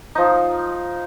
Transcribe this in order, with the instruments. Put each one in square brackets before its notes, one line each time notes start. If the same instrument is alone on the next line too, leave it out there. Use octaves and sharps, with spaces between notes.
[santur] F3 D#4